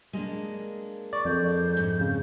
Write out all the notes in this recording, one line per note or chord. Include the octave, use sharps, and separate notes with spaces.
G#3 A#3 D4
D5 C#6
F2 G6
G#2
C#3